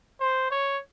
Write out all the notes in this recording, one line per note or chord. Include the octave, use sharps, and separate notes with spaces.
C5
C#5